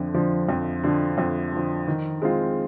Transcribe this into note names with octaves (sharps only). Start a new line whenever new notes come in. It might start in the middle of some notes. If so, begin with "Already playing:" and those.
Already playing: F2 D3 F3
D3 F3
F2
D3 F3
F2
D3 F3
D#3
G#3 C4 F4